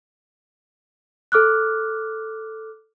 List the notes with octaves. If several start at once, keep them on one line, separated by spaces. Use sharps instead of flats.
A4 D6 F6 F#6